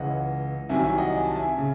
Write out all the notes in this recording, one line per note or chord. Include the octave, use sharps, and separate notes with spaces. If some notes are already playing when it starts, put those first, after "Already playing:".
Already playing: C#2 C#3 E3 D#5 F#5
C2 C3 D#3 F#3 E5 G#5
E5 G#5
D#5 F#5
G#5
A5
E5 G#5
C#3